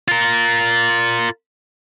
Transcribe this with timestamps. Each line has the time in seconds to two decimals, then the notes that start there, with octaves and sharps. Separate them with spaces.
0.08 F4 A#4